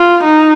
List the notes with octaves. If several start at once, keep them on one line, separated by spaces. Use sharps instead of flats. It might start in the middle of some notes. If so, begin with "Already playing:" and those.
Already playing: F4
D#4